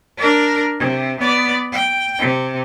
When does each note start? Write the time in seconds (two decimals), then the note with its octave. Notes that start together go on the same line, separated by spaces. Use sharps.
0.17 D4 A#4
0.79 C3
1.20 B3 D5
1.72 G5
2.19 C3